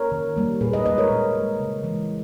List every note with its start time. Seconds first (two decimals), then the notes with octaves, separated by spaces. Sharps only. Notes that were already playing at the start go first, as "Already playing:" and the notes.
Already playing: A#4 C#5
0.12 D#3
0.36 G3 A#3
0.61 A#2 G#4 B4
0.73 B4 D#5
0.86 G#3 B4 D#5
0.98 A#4 C#5
1.10 A#2
1.35 G#3
1.59 C#3
1.84 E3 G#3